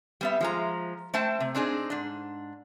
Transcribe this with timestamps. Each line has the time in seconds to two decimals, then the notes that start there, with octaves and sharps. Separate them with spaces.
0.21 G3 B3 E5
0.41 F3 G#3 A#5
1.14 A3 C5 G5 A5
1.40 C3
1.55 C4 D4 D#4 G#4
1.90 G#2 D4